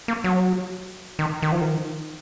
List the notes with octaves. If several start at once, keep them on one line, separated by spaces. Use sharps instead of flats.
A#3
F#3
D#3
D#3
F3
D#3